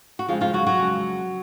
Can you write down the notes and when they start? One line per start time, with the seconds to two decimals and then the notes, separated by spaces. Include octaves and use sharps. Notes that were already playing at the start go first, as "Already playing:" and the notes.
0.19 F#4
0.28 F2 C#3 F3 G#3 C4 F4
0.41 F3 F4
0.53 F#3 F#4
0.66 F#3 F#4
0.79 F2 C#3 G#3 C4